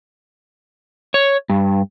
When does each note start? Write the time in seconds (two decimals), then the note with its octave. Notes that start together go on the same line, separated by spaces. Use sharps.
1.14 C#5
1.50 G2